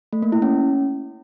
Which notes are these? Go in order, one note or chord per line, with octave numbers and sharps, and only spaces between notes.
A3
A#3
E4
C#4